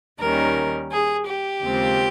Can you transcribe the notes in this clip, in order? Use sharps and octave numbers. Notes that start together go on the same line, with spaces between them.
D#2 D#3 G3 C#4 A#4
G#4
G4
D#2 C#3 G#3 C4 F4